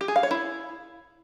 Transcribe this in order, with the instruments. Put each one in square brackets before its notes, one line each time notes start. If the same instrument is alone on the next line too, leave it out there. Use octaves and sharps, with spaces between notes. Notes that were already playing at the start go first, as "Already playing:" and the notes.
[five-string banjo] G4
G#4
F5
C#5
E4